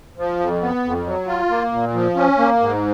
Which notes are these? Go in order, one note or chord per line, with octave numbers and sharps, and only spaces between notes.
F3
F2
B3
F2
F#3
F4
A#3
A#2
F3
C#4
A#3
G#2